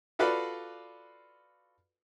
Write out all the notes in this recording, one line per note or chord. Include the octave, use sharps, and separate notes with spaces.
F4 F#4 A4 B4 D5 F5